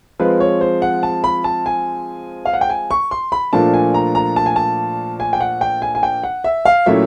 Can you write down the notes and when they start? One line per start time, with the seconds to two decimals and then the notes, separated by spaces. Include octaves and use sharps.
0.19 F3 G#3 C4 B4
0.40 C#5
0.61 C5
0.82 F#5
1.03 A5
1.24 B5
1.44 A5
1.66 G#5
2.45 F5
2.54 F#5
2.61 G5
2.70 G#5
2.91 C#6
3.11 C6
3.32 B5
3.53 A#2 F3 A3 D4 A5
3.74 G#5
3.94 A#5
4.15 A#5
4.36 A5
4.46 G#5
4.56 A5
5.20 G#5
5.33 G5
5.40 F#5
5.61 G5
5.82 G#5
5.95 G#5
6.03 G5
6.23 F#5
6.44 E5
6.65 F5
6.86 A#2 F#3 A3 C#4 E4 E5